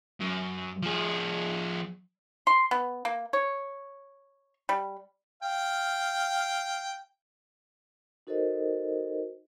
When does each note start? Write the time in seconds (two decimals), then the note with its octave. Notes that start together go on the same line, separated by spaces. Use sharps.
0.20 F#2
0.83 F3 G#4
2.47 C6
2.71 B3
3.05 A#3
3.33 C#5
4.69 G3
5.43 F5 G5
8.27 D#4 F#4 A4 A#4 C5 D#5